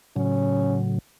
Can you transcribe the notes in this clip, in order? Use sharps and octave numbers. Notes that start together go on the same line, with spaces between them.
A2 C#3 F#3 C#4